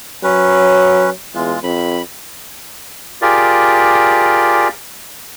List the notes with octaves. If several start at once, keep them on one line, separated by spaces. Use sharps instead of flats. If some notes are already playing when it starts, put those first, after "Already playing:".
F#3 C#4 B4
E2 G#3 F4
F2 B5
F4 G4 G#4 A#4 D5